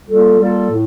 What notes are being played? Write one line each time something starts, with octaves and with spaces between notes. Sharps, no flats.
G3 A#3 F4 A4
G3 A#3 F4 A4
A2